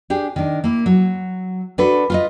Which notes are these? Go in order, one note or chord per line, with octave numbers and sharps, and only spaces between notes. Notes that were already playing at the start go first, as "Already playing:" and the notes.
D4 G4 G#4
D#3 D4
A#3 E4
F#3
D4 F#4 A4 B4
F4 B4 D#5